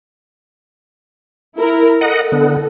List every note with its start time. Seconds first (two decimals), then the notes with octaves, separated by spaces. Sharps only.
1.57 E4 A#4
2.01 A4 D#5 F#5
2.32 D3 B3